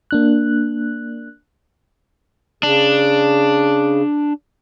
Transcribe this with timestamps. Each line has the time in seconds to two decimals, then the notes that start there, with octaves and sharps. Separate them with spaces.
0.11 A#3 D4 F#6
2.63 C#3 D4